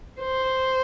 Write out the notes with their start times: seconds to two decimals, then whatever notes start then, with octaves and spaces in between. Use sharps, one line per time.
0.21 C5